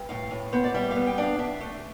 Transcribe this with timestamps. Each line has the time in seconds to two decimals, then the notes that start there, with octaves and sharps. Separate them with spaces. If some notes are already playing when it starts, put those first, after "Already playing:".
Already playing: G2
0.09 A2 F5
0.31 A2
0.53 B3 C5
0.64 D5
0.74 G3 E5
0.91 F5
0.96 B3
1.07 G5
1.18 D4 F5
1.39 D4 E5
1.60 A3